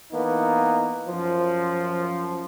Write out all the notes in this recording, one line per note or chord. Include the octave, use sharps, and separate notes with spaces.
E3 A#3 B3 D#4
F#2 F3